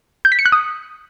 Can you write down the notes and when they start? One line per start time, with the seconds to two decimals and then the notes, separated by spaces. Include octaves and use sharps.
0.25 G6
0.32 B6
0.39 C#7
0.46 F#6
0.52 D#6